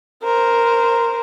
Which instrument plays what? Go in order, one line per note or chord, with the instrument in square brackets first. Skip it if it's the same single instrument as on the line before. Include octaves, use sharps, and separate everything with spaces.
[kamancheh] A#4 C5